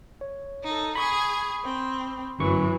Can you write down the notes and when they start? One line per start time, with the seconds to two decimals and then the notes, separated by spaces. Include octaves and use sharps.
0.21 C#5
0.64 D#4 A4
0.95 G#4 B5 C#6 D#6 G#6
1.63 C4
2.39 G1 F#2 E3 F#3 C#6